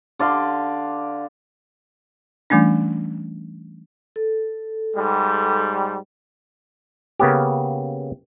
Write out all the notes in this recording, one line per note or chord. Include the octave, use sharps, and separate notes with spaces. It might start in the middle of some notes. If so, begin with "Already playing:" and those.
D3 D5 F5 C6
E3 G3 A3 C#4 D4
A4
G#2 G3
C#3 A#3 B3 C#4 G4